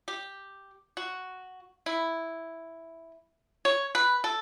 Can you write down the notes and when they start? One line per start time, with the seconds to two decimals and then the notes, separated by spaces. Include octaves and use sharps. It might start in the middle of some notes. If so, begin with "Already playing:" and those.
0.08 G4
0.97 F#4
1.86 E4
3.65 C#5
3.95 B4
4.24 A4